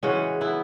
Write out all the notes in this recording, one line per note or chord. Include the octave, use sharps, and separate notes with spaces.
C#3 E3 G#3 C#4 F#4
B3 E4